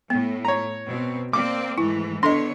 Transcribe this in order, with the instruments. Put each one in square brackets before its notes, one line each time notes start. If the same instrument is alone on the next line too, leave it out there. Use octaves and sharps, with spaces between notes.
[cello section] A2 [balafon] B3
[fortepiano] C#5 A#5
[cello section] B2 C4
[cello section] A#3 C4 D5 [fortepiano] D6
[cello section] G#2 E3 A3 [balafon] E4
[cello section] D3 B3 C#5 [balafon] D4 A4 D#5 [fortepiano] C6